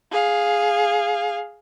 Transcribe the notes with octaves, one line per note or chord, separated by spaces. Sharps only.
G#4 F5